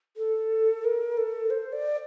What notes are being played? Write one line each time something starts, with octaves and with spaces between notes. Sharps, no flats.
A4
A#4
A4
C5
D5